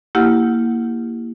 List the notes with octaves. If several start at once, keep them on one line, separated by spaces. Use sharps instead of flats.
A#3 E4 G4 F#5 F6